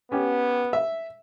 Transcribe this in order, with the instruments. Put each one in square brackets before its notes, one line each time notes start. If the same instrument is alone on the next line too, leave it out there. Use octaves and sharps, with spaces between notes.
[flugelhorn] B3 [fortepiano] C#4 G4
[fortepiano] E5